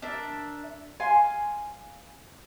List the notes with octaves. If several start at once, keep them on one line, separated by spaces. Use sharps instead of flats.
D4 A#4 E5
F5 G#5 C6